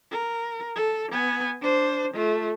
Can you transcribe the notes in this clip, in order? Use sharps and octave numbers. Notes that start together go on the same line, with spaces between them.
A#4
A4
B3 G#5
D4 C5
A3 F4